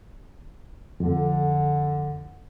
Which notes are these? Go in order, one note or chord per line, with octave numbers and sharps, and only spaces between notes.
F2 D3